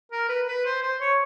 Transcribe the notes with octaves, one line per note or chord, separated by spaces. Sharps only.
A#4
B4
B4
C5
C5
C#5